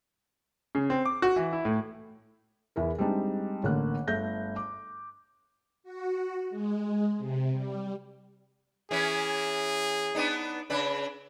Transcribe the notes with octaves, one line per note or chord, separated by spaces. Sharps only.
C#3
C4
D6
F#4
E3
E4
A2
E2 E4 A#4
G3 G#3 C4 D4 D#4
A1 D3 A#3 F#6
G1 A3 G6 A#6
D6
F#4
G#3
C3
G3
E3 C#4 G#4
B3 D4 D#4
C#3 D4 B4